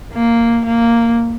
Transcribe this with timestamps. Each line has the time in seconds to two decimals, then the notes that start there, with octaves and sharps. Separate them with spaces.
0.14 A#3
0.66 A#3